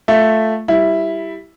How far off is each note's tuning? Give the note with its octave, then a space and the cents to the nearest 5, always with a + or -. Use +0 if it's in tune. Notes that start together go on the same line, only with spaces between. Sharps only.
A3 +0 F4 +0 E5 +0
G3 +0 E4 +0